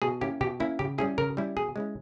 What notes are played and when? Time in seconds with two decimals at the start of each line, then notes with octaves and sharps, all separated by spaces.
0.02 B2 G#4
0.21 A#3 C#4 E4 G4
0.41 B2 G4
0.60 A#3 C#4 E4
0.79 C#3 G4
0.98 G3 C#4 E4 G#4
1.18 C#3 A#4
1.37 G3 C#4 E4
1.57 B2 G#4
1.76 G#3 C#4 E4